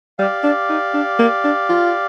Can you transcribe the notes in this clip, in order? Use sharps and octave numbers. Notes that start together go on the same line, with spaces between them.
G3 G4 D5 F5
D4
D#4
D4
A#3
D4
F4